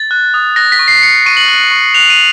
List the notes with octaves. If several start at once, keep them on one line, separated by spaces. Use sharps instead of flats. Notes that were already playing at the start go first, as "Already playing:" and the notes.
Already playing: A6
F#6
D#6
F#6 A#6
B6
C#6
C7
F#6 C#7
C#6 D#7
F#7
F#6
C#6
F#6 F7
D#7